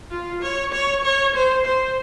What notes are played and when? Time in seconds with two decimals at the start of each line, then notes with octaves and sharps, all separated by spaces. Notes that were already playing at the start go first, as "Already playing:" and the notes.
0.10 F4
0.42 C#5
0.72 C#5
1.04 C#5
1.34 C5
1.65 C5